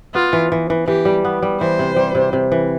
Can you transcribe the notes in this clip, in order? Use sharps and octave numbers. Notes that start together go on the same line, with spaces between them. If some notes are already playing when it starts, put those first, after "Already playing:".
B3 F4
E3
E3
E3
E3 G4
G3
B3
G3
E3 C5
C3
G3
C3
C3
E3